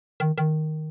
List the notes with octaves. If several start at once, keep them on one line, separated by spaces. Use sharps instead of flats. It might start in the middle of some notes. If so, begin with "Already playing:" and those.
D#3
D#3